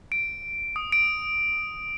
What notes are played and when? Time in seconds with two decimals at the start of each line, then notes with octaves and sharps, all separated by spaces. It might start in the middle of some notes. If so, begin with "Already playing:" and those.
0.12 D7
0.76 D#6
0.92 D7